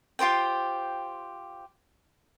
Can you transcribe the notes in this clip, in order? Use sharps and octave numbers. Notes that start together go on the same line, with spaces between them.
F4 G4 C5 G5